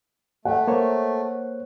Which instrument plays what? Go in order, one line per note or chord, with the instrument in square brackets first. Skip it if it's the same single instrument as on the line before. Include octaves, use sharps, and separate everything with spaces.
[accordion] A3 [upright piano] F#5
[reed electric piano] A#3 C5 C#5